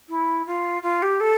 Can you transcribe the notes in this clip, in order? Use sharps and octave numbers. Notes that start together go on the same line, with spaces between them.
E4
F4
F4
G4
A4